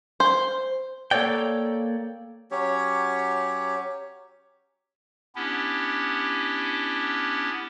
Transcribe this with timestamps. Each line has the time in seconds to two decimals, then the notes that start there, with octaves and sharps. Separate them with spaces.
0.20 C5
1.11 A#3 A4 B4 C#5 D5 G5
2.51 F#3 C#4 G4 C#5
5.36 B3 C#4 D4 E4 G4